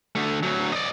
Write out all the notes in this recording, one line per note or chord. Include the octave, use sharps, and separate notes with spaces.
D3 A3
D2 F#3
D5 D#5